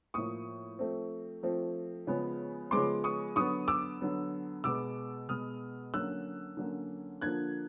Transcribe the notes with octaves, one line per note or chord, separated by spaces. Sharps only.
A2 F3 A#3 C#6 D#6
F3 A3 C4
F3 A3 C4
C#3 F3 G#3 B3
C#3 F3 G#3 B3 C6 D6
C#6 D#6
D3 F#3 B3 C#6 D#6
D6 E6
D3 F#3 B3
B2 G#3 B3 D6 E6
B2 G#3 B3 D#6 F6
D3 F#3 A#3 C#4 E6 F#6
D3 F#3 A#3 C#4
D3 F3 A#3 D4 F#6 G#6